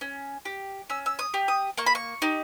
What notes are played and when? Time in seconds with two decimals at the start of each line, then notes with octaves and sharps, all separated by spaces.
0.01 C#4
0.45 G4
0.90 C#4 E6
1.06 E6
1.19 D#6
1.34 G4
1.48 D#6
1.77 A#3 C#6
1.86 B5
1.95 C#6
2.22 D#4 G4